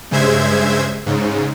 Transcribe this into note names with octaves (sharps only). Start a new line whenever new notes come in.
G2 C#3 G#3 C5 E5 G#6
G#2 C#3